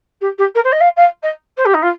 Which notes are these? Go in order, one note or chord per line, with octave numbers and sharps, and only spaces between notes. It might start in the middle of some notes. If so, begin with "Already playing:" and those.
G4
G4
A#4
C5
D#5
F5
F5
D#5
C5
G4
D#4
F4